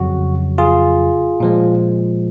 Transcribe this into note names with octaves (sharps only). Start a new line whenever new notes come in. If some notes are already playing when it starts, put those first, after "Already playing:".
Already playing: F2 C#3 F#3 F#4
F4 G#4
A#2 F3 G#3